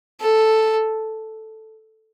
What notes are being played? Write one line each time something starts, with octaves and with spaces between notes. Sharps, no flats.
A4